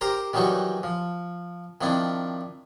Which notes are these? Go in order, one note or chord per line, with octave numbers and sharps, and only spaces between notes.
G4 A#4 C5 A#5
D#3 E3 F#3 G3 D#4 F#4
F3
D#3 F3 C4 D4 E4